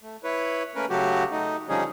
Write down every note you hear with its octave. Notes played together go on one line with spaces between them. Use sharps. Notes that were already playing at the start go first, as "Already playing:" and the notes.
A3
E4 B4 C#5
A3 A#3 C#4 A#4 B4
C#3 F#3 A3 F#4 G4
A3 D#4
D3 F3 G3 C#4 D#4 G#4